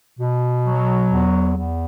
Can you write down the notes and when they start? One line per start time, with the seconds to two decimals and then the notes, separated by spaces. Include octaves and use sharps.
0.19 B2
0.64 F#3
1.09 E2
1.55 E2